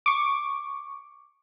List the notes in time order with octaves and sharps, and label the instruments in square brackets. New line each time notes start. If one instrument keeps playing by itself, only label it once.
[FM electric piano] C#6 D6